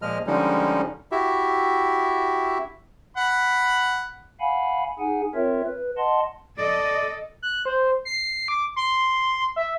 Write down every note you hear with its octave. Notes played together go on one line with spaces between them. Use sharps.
A#2 F3 G#3 D#5 F6
D3 F3 G3 G#3 C#4 D#4
E4 F#4 G4 E5
F#5 B5
F5 F#5 G#5 B5
D#4 G#4 F#5 G#5
C4 F4 A#4 C#5 E5
B4
D#5 F#5 A5 C6
A4 D5 D#5
F#6
C5
C7
D6
C6
E5